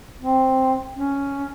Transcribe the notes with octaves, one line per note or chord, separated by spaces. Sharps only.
C4
C#4